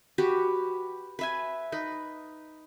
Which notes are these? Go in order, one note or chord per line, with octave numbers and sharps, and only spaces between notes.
F#4 G4 B4
B4 E5 G#5
D#4 B4